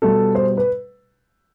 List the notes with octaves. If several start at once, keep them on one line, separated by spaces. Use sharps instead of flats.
B2 G3 A4
C5
B4